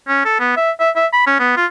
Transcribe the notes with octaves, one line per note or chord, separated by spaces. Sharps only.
C#4
A4
B3
E5
E5
E5
B5
C#4
B3
F4